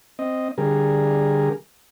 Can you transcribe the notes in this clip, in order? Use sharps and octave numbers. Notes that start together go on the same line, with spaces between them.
C4 D#5
D3 G3 G#4 A#4